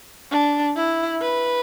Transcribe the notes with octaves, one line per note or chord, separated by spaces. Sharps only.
D4
E4
B4